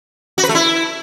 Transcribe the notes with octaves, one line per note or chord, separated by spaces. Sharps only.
F#4
B4
A3
E4